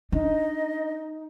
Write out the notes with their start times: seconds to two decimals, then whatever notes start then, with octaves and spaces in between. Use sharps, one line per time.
0.12 D4 D#4 D#5